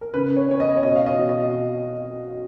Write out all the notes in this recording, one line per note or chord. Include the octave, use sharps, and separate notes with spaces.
A#4
C#3 B4
C#5
C#4 C#5
D#5
C#5
B2 D#5
F5
D#5
B2
D#5